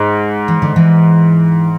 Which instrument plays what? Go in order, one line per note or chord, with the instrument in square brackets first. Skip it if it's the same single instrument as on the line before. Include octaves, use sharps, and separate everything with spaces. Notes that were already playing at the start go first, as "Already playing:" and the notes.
Already playing: [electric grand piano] G#2
[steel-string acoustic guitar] E3
D3
E3